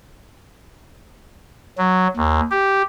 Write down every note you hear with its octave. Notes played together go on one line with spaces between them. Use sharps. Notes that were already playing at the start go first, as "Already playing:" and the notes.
F#3
D#2
G4